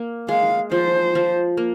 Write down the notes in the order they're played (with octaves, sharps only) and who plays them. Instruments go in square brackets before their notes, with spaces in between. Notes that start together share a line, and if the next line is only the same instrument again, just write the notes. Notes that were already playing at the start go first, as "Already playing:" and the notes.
Already playing: [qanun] A#3
[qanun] G#3 [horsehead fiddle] F5
[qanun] F3 [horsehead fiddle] C5
[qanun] F3
A#3